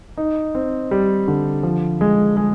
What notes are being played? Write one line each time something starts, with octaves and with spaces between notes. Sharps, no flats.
D#4
C4
G3
D3
F3
G#3
G#3